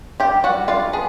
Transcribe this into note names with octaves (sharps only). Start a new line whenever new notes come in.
G3 G4 G5
G3 F#4 F#5
D4 F4 F5
B3 G#4